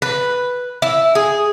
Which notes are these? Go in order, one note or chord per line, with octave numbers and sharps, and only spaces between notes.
B4
E4
G#4